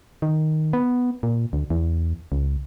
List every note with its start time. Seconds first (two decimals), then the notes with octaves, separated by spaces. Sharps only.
0.22 D#3
0.73 B3
1.23 A#2
1.53 D2
1.70 E2
2.32 C#2